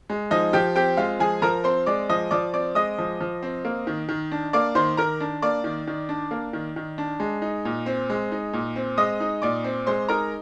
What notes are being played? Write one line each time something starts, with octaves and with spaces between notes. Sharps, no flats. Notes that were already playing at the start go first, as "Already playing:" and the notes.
G#3
F3 D#4 D#5
F3 G4 G5
C4 G4 G5
G#3 F4 F5
F3 G#4 G#5
F3 A#4 A#5
C4 C5 C6
G#3 D5 D6
F3 D#5 D#6
F3 D5 D6
C4 D5 D6
G#3 D#5 D#6
F3
F3
C4
A#3
D#3
D#3
D4
A#3 D5 D6
D#3 C5 C6
D#3 A#4 A#5
D4
A#3 D5 D6
D#3
D#3
D4
A#3
D#3
D#3
D4
G#3
D#4
A#2
C4
G#3
D#4
A#2
C4
G#3 D#5 D#6
D#4
A#2 D5 D6
C4
G#3 C5 C6
D#4 A#4 A#5